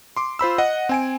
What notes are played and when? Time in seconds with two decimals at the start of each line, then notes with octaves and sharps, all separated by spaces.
0.16 C6 D6
0.39 F4 C5 B5 E6
0.58 D#5 F#5
0.89 C4 G#5 D7